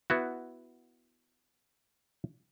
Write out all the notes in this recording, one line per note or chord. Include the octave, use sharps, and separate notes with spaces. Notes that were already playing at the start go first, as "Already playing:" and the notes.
B3 E4 F#4